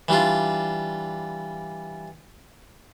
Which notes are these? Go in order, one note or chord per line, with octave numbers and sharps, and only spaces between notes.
E3 G3 D4 F4